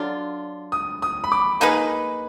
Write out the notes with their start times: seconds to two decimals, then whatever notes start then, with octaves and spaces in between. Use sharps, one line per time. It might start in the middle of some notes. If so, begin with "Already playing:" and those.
Already playing: D3 F#3 D4 F4
0.72 D#6
1.02 D#6
1.24 B5
1.32 D6
1.60 A#3 D#4 G#4 B4 B5